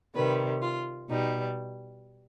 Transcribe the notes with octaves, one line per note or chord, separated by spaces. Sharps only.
C3 D#3 G3 B4
F4
B2 G3 D#4